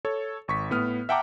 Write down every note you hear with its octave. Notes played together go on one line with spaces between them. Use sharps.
A4 C#5
G#1 C#6 B6
A2 B3 D#6 F6
E5 F#5 G5 A5 A#5 D6